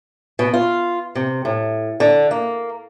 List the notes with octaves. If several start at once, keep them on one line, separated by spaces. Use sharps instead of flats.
B2
F4
C3
A2
D3
A#3